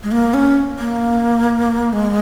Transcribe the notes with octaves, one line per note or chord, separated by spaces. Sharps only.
G#3
A#3
C#4
A#3
G#3